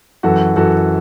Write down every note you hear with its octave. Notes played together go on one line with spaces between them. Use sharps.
F#2 E3 F#4 A4
F#2 E3 F#4 A4